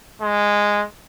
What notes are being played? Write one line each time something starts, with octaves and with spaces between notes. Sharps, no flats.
G#3